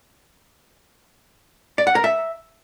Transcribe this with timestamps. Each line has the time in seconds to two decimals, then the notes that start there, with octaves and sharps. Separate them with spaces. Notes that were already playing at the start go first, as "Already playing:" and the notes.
1.78 D5
1.87 F#5
1.95 A#4
2.04 E5